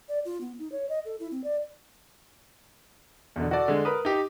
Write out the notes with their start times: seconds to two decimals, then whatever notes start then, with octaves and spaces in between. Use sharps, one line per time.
0.09 D5
0.25 F4
0.41 B3
0.59 D#4
0.72 C#5
0.89 D#5
1.05 A4
1.20 E4
1.31 C4
1.44 D5
3.36 E2 B2 D3
3.51 F#4 A4 D5
3.68 D3 G#3
3.85 A#4 B4 D#6
4.05 D#4 G4